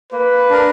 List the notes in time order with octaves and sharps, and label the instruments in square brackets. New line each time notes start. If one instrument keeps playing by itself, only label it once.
[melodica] A#3 [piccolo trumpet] B4
[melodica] D4 A#4